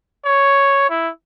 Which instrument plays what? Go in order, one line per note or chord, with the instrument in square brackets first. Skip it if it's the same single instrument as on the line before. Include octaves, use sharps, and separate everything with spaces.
[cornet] C#5
E4